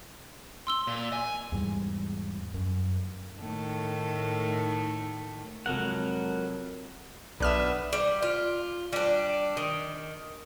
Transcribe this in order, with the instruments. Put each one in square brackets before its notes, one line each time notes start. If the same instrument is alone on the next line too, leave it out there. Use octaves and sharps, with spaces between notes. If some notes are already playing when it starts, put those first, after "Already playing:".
[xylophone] C6 E6 G7
[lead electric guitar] A#2
G#5
[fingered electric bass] E2 G#2 G3
F#2
[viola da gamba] A2 D#3 A3
[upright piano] F2 F#7 [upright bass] C3 G#3 [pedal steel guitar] F#3 A#4 F#5
[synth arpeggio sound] B1 F6 E7 [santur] B3 D4 [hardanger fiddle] B4 E5
[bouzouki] G3
F4
G3 D4
D#3